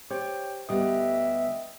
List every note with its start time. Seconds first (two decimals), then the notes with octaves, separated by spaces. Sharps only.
0.10 G4 C5 C#5 G5
0.69 D2 G3 B3 D#5 E5 G5 D#6